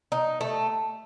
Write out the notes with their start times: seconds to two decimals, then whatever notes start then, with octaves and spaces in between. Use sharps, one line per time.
0.12 D#4
0.41 A3